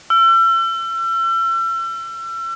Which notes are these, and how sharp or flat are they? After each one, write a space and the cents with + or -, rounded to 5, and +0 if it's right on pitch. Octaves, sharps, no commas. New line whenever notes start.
E6 +40